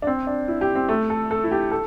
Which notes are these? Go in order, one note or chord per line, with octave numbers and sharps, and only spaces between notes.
D4
C4
D4
E4
G4
C4
A3
A4
A4
E4
G4
A4